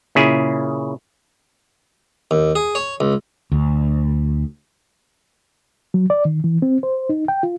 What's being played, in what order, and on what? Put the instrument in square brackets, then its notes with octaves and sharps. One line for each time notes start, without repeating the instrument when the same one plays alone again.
[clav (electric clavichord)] A#2 C#3 E4 G#4
[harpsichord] D#2
G#4
C#5
C#2
[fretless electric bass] D2
[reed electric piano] F#3
D5
D#3
E3
C4
C5
D#4
G5
F4